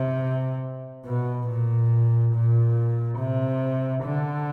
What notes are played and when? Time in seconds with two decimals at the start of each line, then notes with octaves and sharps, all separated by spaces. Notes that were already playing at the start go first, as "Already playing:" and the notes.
Already playing: C3
1.06 B2
1.48 A#2
2.34 A#2
3.19 C3
4.04 D3